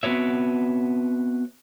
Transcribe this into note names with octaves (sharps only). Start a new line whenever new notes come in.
B3 C4 F#4 B4 C#5 E5